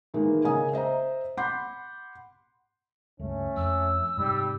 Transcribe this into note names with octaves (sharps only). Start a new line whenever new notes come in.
A2 D#3 E3 G#3 A#3
C#3 A#3 C#4 D#5 G#5 D#6
C5 D#5 E5 A#5
F#5 B5 C6 D6 G6 C7
C#2 G2 A3 C#4
F2 E6
G#2 C3 G3